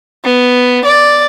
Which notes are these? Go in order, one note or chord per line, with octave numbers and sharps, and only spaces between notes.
B3
D5